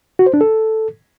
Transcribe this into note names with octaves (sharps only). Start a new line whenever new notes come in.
F#4
C5
D4
A4